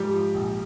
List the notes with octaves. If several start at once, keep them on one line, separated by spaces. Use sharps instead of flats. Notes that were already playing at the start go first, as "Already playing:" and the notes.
Already playing: G#2 F3 G3 G4
F3
A#1